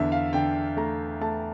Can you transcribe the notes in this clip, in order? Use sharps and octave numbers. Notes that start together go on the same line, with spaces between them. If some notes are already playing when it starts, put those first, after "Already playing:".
Already playing: E2 D3 E5
F5
D3 G5
A3 A#5
A3 A5